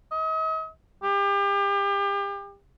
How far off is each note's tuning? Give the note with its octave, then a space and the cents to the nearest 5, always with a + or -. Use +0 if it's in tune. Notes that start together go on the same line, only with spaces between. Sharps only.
D#5 +40
G4 +35